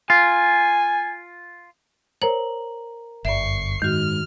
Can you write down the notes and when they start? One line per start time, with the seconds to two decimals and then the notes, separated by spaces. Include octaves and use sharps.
0.10 F4 G#5
2.22 A#4 C5 C#5 A#5 F#7
3.25 G1 F#2 D5 E5 C#6 C7
3.82 G#2 D#3 F#4 F6